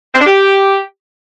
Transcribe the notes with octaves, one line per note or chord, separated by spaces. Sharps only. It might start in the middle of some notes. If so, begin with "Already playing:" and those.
C4
D4
G4